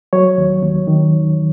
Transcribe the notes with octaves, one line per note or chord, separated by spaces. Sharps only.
F#3 C#5
D#2
D#2
D#3